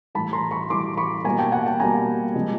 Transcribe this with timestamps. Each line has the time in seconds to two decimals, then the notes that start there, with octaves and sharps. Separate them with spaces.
0.15 A2 E3 G3 A5 B5
0.33 A#5 C6
0.51 B5 C#6
0.70 A2 E3 G3 C6 D6
0.97 B5 C#6
1.24 B2 G3 A#3 G#5 A#5
1.38 G5 A5
1.52 F#5 G#5
1.66 G5 A5
1.80 B2 G3 A#3 G#5 A#5
2.35 C3 F3 G#3